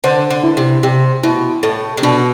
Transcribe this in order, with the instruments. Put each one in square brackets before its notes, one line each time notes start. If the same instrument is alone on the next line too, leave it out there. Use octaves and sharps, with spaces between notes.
[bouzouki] D3 [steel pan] C5
[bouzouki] D3
[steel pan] E4
[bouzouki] C3
[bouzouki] C3 [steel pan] G4
[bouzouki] B2 [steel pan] E4
[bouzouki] A2 [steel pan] A4
[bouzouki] C3
[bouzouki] B2 [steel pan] D4